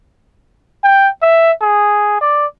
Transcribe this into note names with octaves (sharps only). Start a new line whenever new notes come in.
G5
E5
G#4
D5